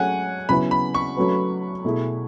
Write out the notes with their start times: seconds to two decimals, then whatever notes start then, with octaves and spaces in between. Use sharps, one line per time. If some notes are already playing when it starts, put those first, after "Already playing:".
Already playing: F#3 A3 C#4 G#4 C#5 F#5 G#5
0.49 C#3 F#3 B3 E4 B4 B5
0.71 B5
0.95 C#6
1.17 F#3 A3 C#4 F#4 B4
1.84 B2 A3 E4 G#4